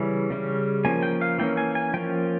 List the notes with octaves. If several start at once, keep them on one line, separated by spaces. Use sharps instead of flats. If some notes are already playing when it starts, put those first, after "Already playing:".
Already playing: C#3 E3 G3 C#4
C#3 G3 C#4
F3 A#3 C#4 G#5
G5
F5
E3 A#3 C#4 G5
G#5
G#5
F3 A#3 C#4 G5